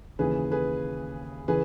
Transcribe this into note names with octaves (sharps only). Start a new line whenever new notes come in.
D#2 C#3 E3 G#4 B4
G#4 B4
C#3 E3 G#4 B4